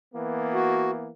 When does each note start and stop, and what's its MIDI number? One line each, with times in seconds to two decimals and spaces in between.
0.15 1.10 52
0.15 1.10 58
0.15 1.10 59
0.54 0.91 66